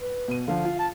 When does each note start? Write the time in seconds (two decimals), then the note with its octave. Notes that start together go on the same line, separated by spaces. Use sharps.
0.02 B4
0.28 B2 D#7
0.48 D3 F3 F5
0.65 F4
0.79 A5